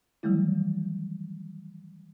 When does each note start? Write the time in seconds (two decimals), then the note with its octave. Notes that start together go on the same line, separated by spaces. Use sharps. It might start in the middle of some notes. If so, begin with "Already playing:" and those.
0.23 D#3 E3 F#3 G3 A3 E4